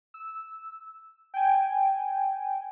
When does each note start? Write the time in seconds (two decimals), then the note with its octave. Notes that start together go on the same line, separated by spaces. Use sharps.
0.14 E6
1.34 G5 G#5